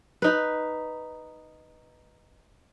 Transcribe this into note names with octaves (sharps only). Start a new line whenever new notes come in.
D#4 B4